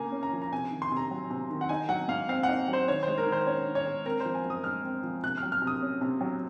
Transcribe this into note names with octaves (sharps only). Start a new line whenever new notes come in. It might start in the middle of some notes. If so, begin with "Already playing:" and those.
Already playing: C#3 A#3 G#5 A#5
C#4
A#5
F3
A#5
C3 G#5
D#3
C6
C3 A#5
F#3
C3
D#3
F#5
D#4 G#5
F#3 F#5
G#2 F5
C4 F5
F#5
D#4
F#3
C5
D#3 C#5
C5
G#3
A#4
D#3
C5
C#4 C#5
D#3
C#5
G#3
C4 A#4
F3 C5
G#5
F#2
D#6
G#3 F6
C4
F3
C3 F#6
F6
F#3
F6
C3
D#6
C#4
C3
F#3